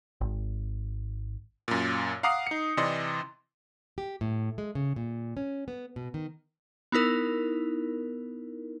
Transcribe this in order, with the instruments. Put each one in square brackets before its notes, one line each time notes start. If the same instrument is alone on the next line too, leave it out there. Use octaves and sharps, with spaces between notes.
[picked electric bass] G#1
[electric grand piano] F#2 A#2
F5 F#5 A#5 D6 D#6 C7
D#4 C#7
C3 E3 D5 D#5 C6
[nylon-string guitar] G4
A2
G#3
C#3
A#2
C#4
B3
B2
D#3
[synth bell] B3 D#4 E4 A#4